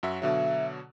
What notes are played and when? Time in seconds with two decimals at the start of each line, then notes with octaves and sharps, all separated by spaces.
0.03 F#2 F#4 E5
0.22 B2 D3 F#3 E5